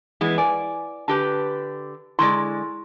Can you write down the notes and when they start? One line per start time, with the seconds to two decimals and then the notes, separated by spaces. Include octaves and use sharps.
0.21 E3 G#3 B3
0.38 B4 D5 G#5
1.08 D3 G4 B4 A5
2.19 D3 G#3 E4 D5 C6 C#6